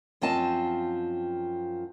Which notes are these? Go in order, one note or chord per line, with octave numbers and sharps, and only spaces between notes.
F#2 F3 C4 D#5 A5